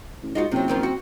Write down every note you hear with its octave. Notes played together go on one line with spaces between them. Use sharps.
A1
G#2 D#4 F4 F#4
F#1 C3 F#3 C4
G2 D#3 F3
F#4